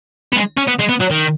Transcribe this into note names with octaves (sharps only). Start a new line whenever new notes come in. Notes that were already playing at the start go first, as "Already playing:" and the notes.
B3
G#3
C#4
B3
G#3
B3
F#3
D#3